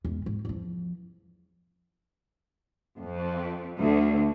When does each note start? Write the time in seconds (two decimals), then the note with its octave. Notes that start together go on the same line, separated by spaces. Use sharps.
0.05 E2 G#3
0.26 G#1
0.45 E2 F3
3.00 F2
3.80 D2